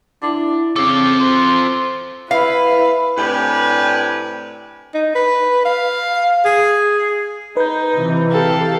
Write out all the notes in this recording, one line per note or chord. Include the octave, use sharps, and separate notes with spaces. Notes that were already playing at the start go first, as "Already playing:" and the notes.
D4 E4
C#3 C4 F4 A4 D6
C5
E4 B4 E5 F5
A2 C3 D4 G4 B4 G#5
D#4
B4
F5
G#4
D#4 B4 G6
C3 E3
G4 A4 F5